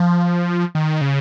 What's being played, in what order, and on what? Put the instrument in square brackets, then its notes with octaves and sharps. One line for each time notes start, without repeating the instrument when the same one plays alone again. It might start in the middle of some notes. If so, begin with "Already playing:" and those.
Already playing: [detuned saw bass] F3
D#3
C#3